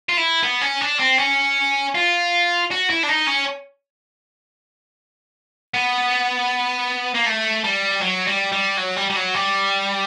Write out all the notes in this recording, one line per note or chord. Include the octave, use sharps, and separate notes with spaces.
F4
E4
B3
C#4
D4
C4
C#4
F4
F#4
E4
D4
D#4
C#4
B3
A#3
A3
G3
F#3
G3
G3
F#3
G3
G3
F#3
G3